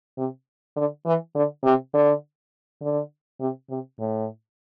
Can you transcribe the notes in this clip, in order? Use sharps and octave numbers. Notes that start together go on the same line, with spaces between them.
C3
D3
E3
D3
C3
D3
D3
C3
C3
A2